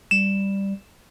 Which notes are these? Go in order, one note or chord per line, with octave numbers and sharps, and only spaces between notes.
G3 E7